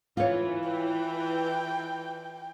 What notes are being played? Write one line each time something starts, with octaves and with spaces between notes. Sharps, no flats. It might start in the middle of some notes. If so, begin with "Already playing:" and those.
E3 F4 C#5
G5